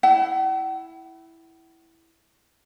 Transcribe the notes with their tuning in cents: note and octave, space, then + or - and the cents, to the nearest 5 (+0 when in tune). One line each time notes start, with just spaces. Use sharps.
E4 +0 F#5 +45